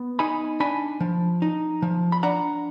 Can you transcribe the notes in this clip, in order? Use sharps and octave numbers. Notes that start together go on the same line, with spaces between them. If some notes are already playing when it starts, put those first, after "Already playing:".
Already playing: B3
D#4 G#5 B5
D4 G#5 B5
F3
D#4
F3
B5
D4 F#5 A#5